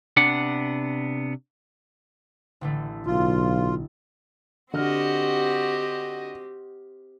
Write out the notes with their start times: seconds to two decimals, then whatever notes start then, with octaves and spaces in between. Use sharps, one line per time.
0.17 C3 B3 D4 F#5
2.61 A1 D3 A3
3.07 B1 F4
4.74 D3 C4 F#4 G4 D#5 F6